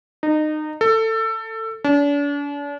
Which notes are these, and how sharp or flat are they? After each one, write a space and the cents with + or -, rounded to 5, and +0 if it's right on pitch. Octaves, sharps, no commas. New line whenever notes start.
D#4 -25
A4 +20
D4 -40